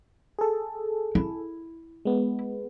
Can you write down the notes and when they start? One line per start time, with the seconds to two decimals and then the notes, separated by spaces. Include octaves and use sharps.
0.39 G#4 A4
1.15 E4
2.05 G#3 B3